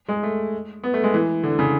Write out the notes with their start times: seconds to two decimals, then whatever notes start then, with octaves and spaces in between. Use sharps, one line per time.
0.09 G#3
0.23 A3
0.84 B3
0.94 A3
1.04 G#3
1.14 E3
1.43 D3
1.59 C#3